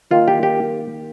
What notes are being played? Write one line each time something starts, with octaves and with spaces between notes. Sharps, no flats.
D#3 A#3 D#4 F4
G4
G4